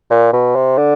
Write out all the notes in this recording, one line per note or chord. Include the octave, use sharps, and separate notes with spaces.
A#2
B2
C3
D3